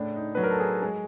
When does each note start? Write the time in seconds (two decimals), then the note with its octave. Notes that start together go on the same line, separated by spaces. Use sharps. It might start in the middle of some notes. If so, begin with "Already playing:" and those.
Already playing: A2 C#3 D4
0.16 D#4
0.35 F#3 B4
0.43 A#4
0.51 A4
0.60 G#4
0.82 G#3